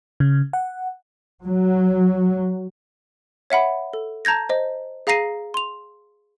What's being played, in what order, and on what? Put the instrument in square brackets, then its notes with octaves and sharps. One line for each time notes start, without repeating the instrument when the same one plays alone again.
[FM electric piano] C#3
F#5
[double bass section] F#3
[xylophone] C#5 E5 F#5 B5
A4
A5 A#5 G6 G#6 A#6
C5 D#5
G#4 F5 A#5 A#6 C7 D#7
C6 F7